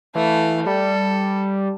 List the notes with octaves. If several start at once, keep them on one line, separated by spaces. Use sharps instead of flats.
E3 A3 F5
G3 A4